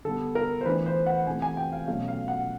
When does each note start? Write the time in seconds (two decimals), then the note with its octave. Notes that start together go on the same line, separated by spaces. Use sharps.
0.05 D3 G3 B3 A4
0.35 A#4
0.61 C5
0.65 E3 A3 D4 B4
0.86 C5
1.06 F#5
1.27 C3 E3 A3 G#5
1.42 G#5
1.57 G5
1.72 F5
1.87 B2 F#3 A3 C#4 F5
2.08 F5
2.28 F#5